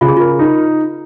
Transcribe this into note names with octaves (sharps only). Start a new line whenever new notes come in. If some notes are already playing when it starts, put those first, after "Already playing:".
C#3 F4
G#4
F4 A#4
D#4